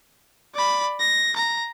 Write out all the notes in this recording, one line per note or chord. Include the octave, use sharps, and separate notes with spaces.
D5 B5
A#6
A#5